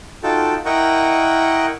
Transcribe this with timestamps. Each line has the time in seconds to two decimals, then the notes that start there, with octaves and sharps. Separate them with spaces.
0.23 D#4 F4 F#4 A4 G5 A5
0.65 E4 A#4 D#5 F#5 G5 C#6